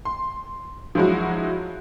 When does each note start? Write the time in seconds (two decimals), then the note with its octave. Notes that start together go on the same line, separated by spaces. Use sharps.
0.05 C6
0.95 F3 F#3 G#3 E4 F#4